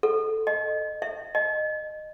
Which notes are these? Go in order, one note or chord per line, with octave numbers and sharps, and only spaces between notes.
A4
D#5
E5
D#5